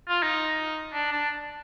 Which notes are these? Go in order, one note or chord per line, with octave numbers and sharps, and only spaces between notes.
F4
D#4
D4
D4